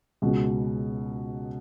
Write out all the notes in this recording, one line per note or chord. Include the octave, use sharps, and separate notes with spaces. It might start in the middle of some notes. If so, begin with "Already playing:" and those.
C#2 B2 G#3